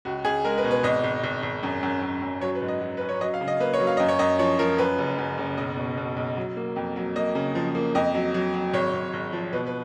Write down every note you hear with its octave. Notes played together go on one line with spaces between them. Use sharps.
C#2 F#4
C#2 G#4
G#3 A#4
B4
B2
B4
G#1 D#5
G#1
G#1
G#1
F#2
F#2
F#2
F#2
F#3 C#5
B4
G#2
D#5
F#3
C#4 B4
C#5
F#3 D#5
F5
C#3
D#5
A#3 B4
C#5
F#3
F5
F#2 D#5
C#5
F#2 D#5
F3 C#5
F3 A#4
F#2 B4
F#1
F#2
F#1
B1 D#5
B2
B2
B1
F#3
A#3
F2
F#3
A#3 D#5
C#3
F3
A#3
F2 D#5
F#3
F#3
F#3
G#1 C#5
G#1
G#1
F3
B2 B4
B4